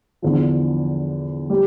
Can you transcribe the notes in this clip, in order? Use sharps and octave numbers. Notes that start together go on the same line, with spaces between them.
E2 D3 F3
G3